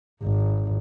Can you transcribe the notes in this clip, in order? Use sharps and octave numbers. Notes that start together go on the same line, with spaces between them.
G#1